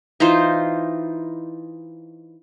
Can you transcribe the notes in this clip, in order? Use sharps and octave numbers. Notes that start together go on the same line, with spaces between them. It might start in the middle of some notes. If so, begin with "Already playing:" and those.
E3 D#4 F4 C5